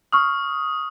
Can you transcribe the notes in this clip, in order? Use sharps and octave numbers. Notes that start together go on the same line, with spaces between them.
C#6 D#6 F6